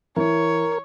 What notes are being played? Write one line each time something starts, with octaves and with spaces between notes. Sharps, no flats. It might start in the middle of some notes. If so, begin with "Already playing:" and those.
E3 A#4 C#5